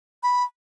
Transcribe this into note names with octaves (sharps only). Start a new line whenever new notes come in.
B5